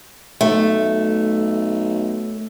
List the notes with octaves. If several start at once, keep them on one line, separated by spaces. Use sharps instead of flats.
B1 A3